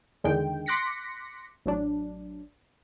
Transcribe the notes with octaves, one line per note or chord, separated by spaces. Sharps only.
E2 D3 D#3 G#3 G5
C6 D6 F#6 A#6 B6 C#7
A1 F#3 D4